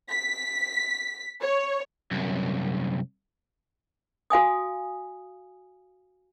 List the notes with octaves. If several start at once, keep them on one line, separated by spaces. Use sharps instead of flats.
B6
C#5
C2 F#2
F#4 F5 G#5 D#6